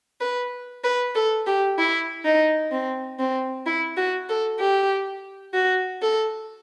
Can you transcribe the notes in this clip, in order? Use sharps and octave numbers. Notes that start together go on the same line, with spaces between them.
B4
B4
A4
G4
E4
D#4
C4
C4
E4
F#4
A4
G4
F#4
A4